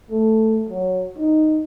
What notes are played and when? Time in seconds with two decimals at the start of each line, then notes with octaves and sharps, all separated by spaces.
0.11 A3
0.69 F#3
1.18 D#4